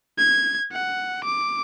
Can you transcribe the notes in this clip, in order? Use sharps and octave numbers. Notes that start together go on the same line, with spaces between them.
G#6
F#5
D6